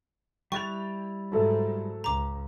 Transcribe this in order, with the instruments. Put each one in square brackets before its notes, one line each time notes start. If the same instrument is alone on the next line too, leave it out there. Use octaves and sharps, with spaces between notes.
[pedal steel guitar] G3 E4 F#6 [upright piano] G5 A6 F7 [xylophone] C#6
[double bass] G#2 [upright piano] F#3 A3 A4
[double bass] C#2 [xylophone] A#5 D6